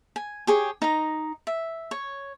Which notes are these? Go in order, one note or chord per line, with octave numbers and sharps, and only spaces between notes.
G#5
G4 G#4 C#5
D#4 A#5
E5
C#5